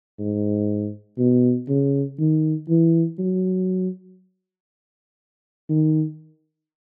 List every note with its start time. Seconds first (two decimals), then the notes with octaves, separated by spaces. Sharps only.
0.19 G#2
1.19 B2
1.69 C#3
2.19 D#3
2.69 E3
3.18 F#3
5.70 D#3